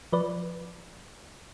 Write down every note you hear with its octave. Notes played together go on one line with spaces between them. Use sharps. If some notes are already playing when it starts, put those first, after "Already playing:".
F3 B4 D5